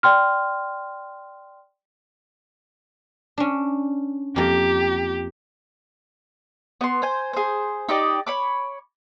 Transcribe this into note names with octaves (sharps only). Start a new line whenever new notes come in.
D5 G5 C6 F6
C#4 D4
F2 A#3 G4
B3 C6
C5 G#5
G#4 C5
D#4 G4 D5 D#5
C#5 B5 D6